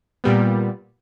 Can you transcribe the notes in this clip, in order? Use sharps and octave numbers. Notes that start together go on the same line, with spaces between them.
A#2 G3 B3